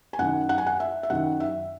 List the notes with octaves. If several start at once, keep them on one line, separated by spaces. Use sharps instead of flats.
G#5
F#2 D#3 F#5
F#5
G#5
F#5
E5
E5
F#2 D#3 F#5
E5